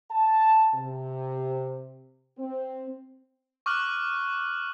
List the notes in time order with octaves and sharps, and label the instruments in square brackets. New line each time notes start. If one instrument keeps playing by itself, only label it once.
[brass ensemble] A5
C3
C4
[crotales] C#6 D6 F6 F#6 F#7